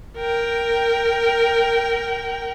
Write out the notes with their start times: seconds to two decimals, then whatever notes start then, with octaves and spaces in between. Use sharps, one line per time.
0.18 A#4 G5